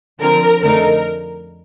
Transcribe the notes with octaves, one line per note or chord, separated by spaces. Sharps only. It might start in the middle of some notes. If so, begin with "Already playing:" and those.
D3 F3 C4 A#4
F2 D3 A3 D#4 A#4